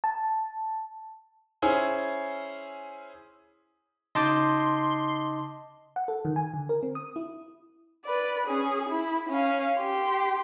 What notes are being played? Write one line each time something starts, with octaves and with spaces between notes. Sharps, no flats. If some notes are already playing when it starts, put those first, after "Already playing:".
A5
C#4 E4 G#4 C5
C#3 D#4 D#5 A5 C6 D6 G6
F#5
A4
D#3
G#5
D3
A#4
C4
D#6
E4
B4 D5
C#4 G#4
E4
C#4 F5
G4 C6